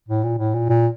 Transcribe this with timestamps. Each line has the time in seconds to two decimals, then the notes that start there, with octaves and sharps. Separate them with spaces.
0.09 A2
0.24 A#2
0.38 A2
0.54 A#2
0.70 A#2